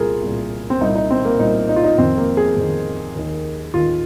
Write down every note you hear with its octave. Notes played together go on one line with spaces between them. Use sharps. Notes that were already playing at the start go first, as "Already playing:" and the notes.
Already playing: C2 A#2 F4 G#4 A#4
C2 A#2
C4
C2 A#2 D#4
D#4
C4
A#3
C2 A#2 D#4
D#4
F4
D#4
F2 D#3 C4
A#3
G#4
F2 D#3
D#2 D#3
D#2 D#3 F4